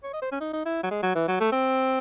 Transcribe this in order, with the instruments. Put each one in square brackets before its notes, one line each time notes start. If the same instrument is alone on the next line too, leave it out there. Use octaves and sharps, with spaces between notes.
[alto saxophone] C#5
D#5
C5
C#4
D#4
D#4
E4
F#3
G#3
F#3
E3
F#3
A3
C4